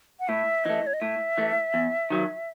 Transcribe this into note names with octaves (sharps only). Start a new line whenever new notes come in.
F#5
A2 E5
E3 A3 D#5
C#5
D#5
A2 E5
E3 A3
E2
D#3 F#3